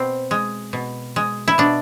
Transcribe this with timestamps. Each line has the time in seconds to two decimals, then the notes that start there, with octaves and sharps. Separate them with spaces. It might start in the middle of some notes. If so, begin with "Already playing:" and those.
Already playing: B2 C4
0.31 G#3
0.73 B2
1.16 G#3
1.48 E4
1.58 B2 D4